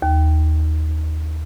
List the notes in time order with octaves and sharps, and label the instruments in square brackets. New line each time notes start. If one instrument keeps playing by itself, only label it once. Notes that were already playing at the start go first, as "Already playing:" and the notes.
[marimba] D#2